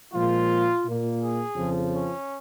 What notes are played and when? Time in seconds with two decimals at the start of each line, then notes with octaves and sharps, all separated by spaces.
0.13 A#2 F3 G#3 F4
0.85 A#2 A#3
1.21 G#4
1.55 F2 C#3 F3
1.91 C#4